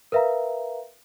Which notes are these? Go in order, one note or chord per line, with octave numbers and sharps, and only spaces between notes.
A#4 B4 E5 F5 A#5